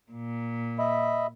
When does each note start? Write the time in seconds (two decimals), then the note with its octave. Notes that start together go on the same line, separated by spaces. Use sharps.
0.10 A#2
0.79 D#5 E5 B5